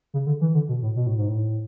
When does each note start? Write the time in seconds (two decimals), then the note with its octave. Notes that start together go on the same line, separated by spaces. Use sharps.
0.14 C#3
0.26 D3
0.41 E3
0.54 D3
0.69 B2
0.82 A2
0.96 B2
1.07 A2
1.18 G#2
1.28 A2